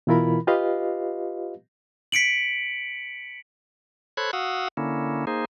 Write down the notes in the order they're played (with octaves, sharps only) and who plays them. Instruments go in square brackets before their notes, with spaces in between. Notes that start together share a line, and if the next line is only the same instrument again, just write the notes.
[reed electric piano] B2 E3 E4 F4 A#4 B5
F4 G4 B4 D#5 F5
[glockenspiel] B6 C#7 D7 F#7
[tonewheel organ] A4 C5 C#5 B5 F#6 G#6
F#4 F5 F#5 D#6 E6
D3 A#3 C#4 E4
A#3 D#4 G#4 C5